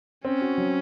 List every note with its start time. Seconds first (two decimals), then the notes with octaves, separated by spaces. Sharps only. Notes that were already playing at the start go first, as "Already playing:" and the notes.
0.24 C4 C#4
0.41 F#4
0.58 F#3